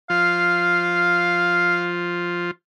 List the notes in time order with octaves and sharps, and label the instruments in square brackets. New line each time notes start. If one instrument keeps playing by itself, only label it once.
[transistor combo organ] F3 F4 [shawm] F5